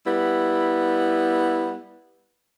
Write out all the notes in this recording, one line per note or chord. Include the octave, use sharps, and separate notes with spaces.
G3 B3 E4